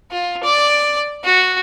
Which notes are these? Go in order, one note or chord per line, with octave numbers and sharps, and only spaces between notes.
F4
D5
F#4